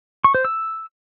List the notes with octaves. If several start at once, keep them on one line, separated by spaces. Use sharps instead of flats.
C#6
C5
E6